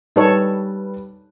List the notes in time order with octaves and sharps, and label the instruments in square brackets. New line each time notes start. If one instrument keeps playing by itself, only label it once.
[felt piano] G3 B4 [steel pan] D#4 A4 C#5